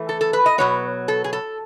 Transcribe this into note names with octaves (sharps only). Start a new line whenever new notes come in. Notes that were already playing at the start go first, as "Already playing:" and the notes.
Already playing: E3 A3
A4
A4
B4
D#5
B2 F#3 B3 C#5
A4
G#4
A4